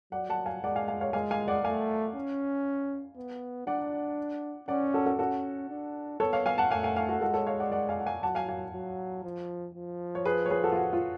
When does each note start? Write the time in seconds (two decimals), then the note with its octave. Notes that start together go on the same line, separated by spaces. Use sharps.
0.12 F#3 D5 F#5
0.30 F#5 A5
0.46 F5 G#5
0.63 G#3 D5 F#5
0.76 F5 G#5
0.88 F5 G#5
1.01 C#5 F5
1.13 G#3 F5 G#5
1.31 F5 G#5
1.48 D5 F#5
1.64 A3 F5 G#5
2.15 C#4
3.17 B3
3.67 D4 D5 F#5
4.68 C#4 D5 F#5
4.93 F#4 A4
5.06 F#4 A4
5.19 C#4 F#4 A4
5.70 D4
6.20 B3 A4 C#5
6.33 C#5 F5
6.46 F5 G#5
6.58 F#5 A5
6.71 A3 F5 G#5
6.83 F5 G#5
6.96 F5 G#5
7.09 F#4 A4
7.21 G#3 F#4 A4
7.34 A4 C#5
7.47 C#5 F5
7.60 D5 F#5
7.72 D5 F#5
7.89 F5 G#5
8.00 F#5
8.06 F5 G#5
8.23 F#3 F#5 A5
8.35 F5 G#5
8.48 F5 G#5
8.74 F#3
9.24 F3
9.75 F3
10.15 C#5
10.25 G#4 B4
10.46 C#5
10.50 G#4 B4
10.63 F#4 A4
10.72 F4
10.75 F#4
10.93 F4